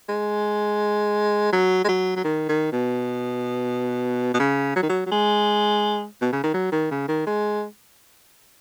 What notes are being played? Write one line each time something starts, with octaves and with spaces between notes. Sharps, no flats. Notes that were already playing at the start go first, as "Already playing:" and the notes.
G#3
F#3
G#3
F#3
F#3
D#3
D#3
B2
B2
C#3
F#3
D#3
F#3
F#3
G#3
B2
C#3
D#3
F#3
D#3
C#3
D#3
G#3